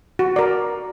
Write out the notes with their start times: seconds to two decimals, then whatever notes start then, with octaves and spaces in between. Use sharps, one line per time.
0.19 F#4
0.36 A#4 D5